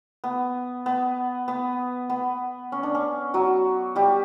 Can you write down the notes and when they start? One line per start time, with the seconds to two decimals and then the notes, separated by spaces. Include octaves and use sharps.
0.24 B3
0.86 B3
1.48 B3
2.10 B3
2.72 C#4
2.83 D4
2.95 C#4
3.34 F#3 F#4
3.96 G3 G4